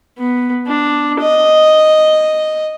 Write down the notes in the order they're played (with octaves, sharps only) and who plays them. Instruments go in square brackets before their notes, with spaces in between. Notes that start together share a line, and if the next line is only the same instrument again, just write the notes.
[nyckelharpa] B3
D4
D#5